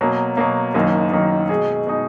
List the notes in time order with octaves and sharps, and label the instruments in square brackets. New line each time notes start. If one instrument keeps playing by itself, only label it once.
[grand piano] B2 F#3 A#3
B2 F#3 A#3
F#1 F#2 D#3 A#3 D#4
F#1 F#2 D#3 A#3 D#4
B2 G#3 D#4 G#4
B2 G#3 D#4 G#4